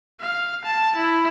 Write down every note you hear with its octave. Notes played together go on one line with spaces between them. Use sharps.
F5
A5
E4